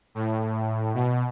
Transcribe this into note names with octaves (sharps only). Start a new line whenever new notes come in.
A2
B2